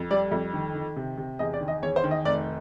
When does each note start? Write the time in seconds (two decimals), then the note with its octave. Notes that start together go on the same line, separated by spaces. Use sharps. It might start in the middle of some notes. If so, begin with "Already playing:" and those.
Already playing: F2
0.11 G3 D5
0.31 F2
0.53 D#3
0.75 D#3
0.96 C3
1.17 C3
1.39 E2 D#5
1.53 D5
1.61 D#3
1.68 D#5
1.82 E2 C#5
1.96 C5
2.04 D#3
2.11 D#5
2.25 F1 D5